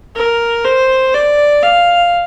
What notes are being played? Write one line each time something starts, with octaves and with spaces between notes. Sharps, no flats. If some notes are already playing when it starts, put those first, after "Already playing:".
A#4
C5
D5
F5